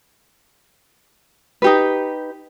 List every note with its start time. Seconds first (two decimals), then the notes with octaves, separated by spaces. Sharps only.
1.62 D#4 G4 B4